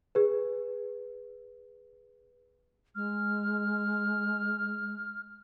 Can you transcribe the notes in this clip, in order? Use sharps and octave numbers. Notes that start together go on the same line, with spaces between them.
G#4 B4
G#3 F6